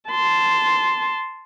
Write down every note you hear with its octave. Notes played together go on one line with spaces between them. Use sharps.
A5 C6